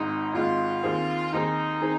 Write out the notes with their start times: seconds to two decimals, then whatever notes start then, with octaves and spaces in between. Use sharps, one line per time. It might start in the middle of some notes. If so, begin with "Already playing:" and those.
Already playing: G#1 G#2 G#3 D#4
0.33 G#1 G#2 G#3 F4
0.83 D#2 D#3 C4 G#4
1.33 D#2 D#3 C4 D#4 G#4
1.81 D#3 C4 G#4